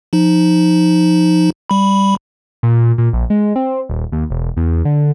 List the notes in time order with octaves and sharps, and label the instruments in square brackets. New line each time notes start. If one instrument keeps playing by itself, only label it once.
[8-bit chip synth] F3 D#4
G3 B5
[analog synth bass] A#2
A#2
A#1
G#3
C4
D#1
D#2
E1
E2
D3